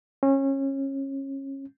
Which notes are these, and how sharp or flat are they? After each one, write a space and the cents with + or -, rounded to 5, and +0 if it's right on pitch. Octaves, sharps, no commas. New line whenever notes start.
C#4 -25